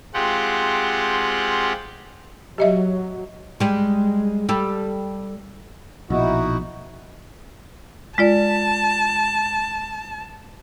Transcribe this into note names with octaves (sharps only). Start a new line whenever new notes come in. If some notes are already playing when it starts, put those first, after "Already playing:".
G#3 C4 F4 G4 F#5
F#3 G4 D#5 E5
G3 G#3
G3 A4
A#1 B2 D#4 E4 F#4
G#3 F4 D5 A5